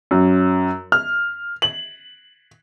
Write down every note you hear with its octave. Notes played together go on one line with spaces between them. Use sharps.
F#2
F6
F#7